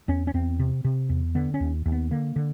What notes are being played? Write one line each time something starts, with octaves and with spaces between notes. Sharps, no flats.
E2 C#4
C#4
E2 C4
C3
C3
E2
D3 B3
C#4
D#2
D#2
B3
D3 A#3
D3